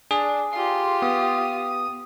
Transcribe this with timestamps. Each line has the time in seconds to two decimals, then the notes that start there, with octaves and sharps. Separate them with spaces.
0.11 D4 G#4
0.53 F4 G4 C6
1.02 B3 D#6